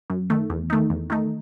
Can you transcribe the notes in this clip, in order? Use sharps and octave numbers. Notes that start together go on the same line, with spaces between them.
F#2
D#3 A3
E2
D#3 A3 D#4
E2
D#3 A3 D#4